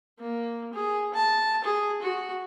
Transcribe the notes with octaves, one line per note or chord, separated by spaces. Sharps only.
A#3
G#4
A5
G#4
F#4